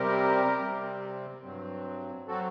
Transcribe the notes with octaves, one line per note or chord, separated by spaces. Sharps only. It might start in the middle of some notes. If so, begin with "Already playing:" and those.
Already playing: C3 G3 C4 G4 A#4
C3 G3 C4
G2 F#3 C4
F#3 C4 F#4 A4